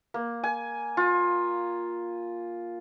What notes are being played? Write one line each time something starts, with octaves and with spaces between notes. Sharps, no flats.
A#3
G#5
F4